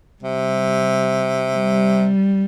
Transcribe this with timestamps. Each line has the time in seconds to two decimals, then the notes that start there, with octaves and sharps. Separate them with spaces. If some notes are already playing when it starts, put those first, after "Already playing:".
0.23 C3 G3
1.57 G3